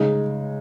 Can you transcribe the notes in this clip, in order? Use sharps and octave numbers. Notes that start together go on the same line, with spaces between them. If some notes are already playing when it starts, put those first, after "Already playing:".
Already playing: C#3 G#3 D#4